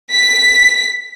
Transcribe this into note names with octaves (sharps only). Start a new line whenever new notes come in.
B6